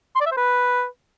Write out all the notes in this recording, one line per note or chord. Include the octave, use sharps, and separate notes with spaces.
C6
D5
E5
C5
B4